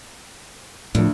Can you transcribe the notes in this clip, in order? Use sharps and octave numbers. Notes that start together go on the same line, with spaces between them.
D2 A2 F3